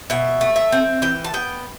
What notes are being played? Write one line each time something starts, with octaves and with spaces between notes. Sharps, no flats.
B2 E5
A3
E5
C4
E3 G5
A5
B3 G5